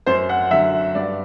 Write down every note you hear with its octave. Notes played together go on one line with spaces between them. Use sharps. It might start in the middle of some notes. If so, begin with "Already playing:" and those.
F#2 C5
F#5
D3 F#3 E5
G2 D5